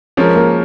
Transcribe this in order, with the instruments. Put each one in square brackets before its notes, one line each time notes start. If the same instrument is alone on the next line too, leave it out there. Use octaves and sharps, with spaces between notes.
[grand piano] F3 C#4 A#4 [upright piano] G#3
[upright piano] A#3